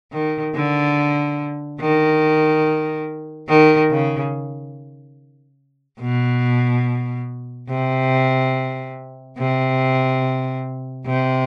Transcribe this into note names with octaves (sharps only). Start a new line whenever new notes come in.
D#3
D3
D#3
D#3
C#3
B2
C3
C3
C3